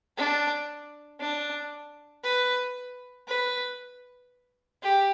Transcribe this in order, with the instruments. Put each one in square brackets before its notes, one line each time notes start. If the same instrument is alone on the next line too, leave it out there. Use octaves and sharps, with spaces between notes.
[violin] D4
D4
B4
B4
G4